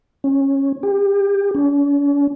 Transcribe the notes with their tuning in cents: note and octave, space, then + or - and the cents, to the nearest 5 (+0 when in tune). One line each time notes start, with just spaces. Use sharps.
C#4 -15
G4 +30
C#4 +45